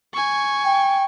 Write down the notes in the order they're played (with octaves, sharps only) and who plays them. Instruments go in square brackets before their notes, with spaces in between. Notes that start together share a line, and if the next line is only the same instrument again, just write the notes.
[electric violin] G#5 C#6
[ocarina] G5